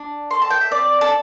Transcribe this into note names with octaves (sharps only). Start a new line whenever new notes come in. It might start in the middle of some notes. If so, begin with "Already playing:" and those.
Already playing: D4
A4 C6
A5
G5
E5
C4 D5
A4